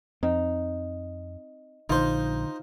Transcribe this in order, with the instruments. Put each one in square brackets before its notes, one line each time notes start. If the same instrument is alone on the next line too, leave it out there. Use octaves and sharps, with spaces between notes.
[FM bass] F2 [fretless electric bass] C4 [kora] D#4
[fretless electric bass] A#1 [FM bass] D3 [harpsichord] D#4 C5 [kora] F4